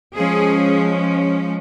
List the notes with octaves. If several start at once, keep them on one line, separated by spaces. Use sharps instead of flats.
F3 G#3 C#4 G#4